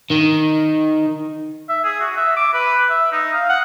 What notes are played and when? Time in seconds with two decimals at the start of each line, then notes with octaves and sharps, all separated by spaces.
0.10 D#3
1.69 E5
1.84 G#4
2.01 F#4
2.17 E5
2.37 D6
2.54 B4
2.90 E5
3.12 D#4
3.33 F5
3.49 F#5